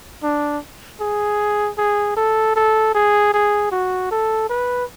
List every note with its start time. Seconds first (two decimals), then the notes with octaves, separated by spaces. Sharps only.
0.23 D4
1.00 G#4
1.78 G#4
2.16 A4
2.56 A4
2.95 G#4
3.34 G#4
3.71 F#4
4.11 A4
4.50 B4